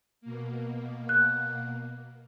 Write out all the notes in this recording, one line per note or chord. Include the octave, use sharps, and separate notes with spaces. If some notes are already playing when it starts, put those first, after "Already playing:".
B2 A#3
F#6